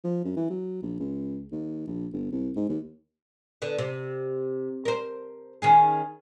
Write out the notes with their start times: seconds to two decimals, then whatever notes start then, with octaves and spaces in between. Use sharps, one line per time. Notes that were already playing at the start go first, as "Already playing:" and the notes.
0.04 F3
0.24 F#2
0.36 E3
0.50 F#3
0.83 A#1
1.00 C#2
1.52 D#2
1.87 A#1
2.13 G1
2.32 C2
2.56 G#2
2.69 D#2
3.62 D3 B3
3.78 C3
4.85 A#4 C5
5.62 D#3 C#4 G#4